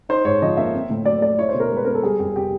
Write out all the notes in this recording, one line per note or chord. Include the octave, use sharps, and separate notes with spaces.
D#4 C5
G#2 C#5
F3 D#5
A#3 E5
C4
A2
F#3 D5
A3 D5
E4 C#5
C5
B2
A#4
G#3
B4
B3 A#4
A4
G3 G#4
F2 G4
C3 G4